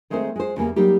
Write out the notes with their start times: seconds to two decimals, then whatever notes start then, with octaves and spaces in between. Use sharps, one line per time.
0.10 D#3 G#3 A3 C4 A#4 C5
0.36 G#3 C5
0.57 E2 C#3 G3 A#3 G#5
0.76 F#3 G3 A#3 D#4 G4